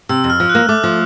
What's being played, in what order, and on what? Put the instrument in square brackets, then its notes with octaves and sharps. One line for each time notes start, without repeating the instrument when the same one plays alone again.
[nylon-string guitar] C3 [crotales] E6
[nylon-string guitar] F2
[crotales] F6
[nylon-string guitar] F3
[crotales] F#6
[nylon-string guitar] A#3
[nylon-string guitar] A3 [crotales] D6
[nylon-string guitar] F3